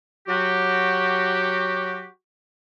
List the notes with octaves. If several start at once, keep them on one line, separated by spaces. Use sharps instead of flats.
F#3 F#4 G4